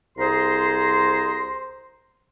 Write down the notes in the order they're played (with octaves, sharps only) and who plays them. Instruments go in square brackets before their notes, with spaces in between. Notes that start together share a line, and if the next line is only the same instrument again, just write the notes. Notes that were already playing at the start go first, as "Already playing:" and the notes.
[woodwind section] C2 G#4 C5 A#5 C6